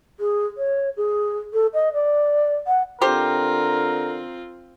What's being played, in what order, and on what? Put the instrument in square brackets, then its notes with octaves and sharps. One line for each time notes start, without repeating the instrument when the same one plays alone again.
[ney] G#4
C#5
G#4
A4
D#5
D5
F#5
[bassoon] D3 [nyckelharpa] C4 F4 [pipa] G4 C5 [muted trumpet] A#4